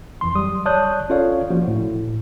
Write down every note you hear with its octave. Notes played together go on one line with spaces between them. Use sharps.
F2 E3 C6
F#3 G3 D#6
C#5 D5 A5 D#6 F#6 G6
C#4 F4 A4 C#5 D5 F5
F3 A#3 F#4
A2